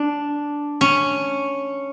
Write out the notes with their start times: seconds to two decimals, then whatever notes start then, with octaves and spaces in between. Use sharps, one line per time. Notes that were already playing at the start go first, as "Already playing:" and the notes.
Already playing: D4
0.81 C#4